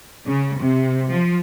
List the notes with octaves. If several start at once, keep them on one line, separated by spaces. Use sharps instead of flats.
C#3
C3
F3